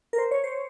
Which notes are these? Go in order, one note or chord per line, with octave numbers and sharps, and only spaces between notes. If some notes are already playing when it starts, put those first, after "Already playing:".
A#4
C5
C#5
C5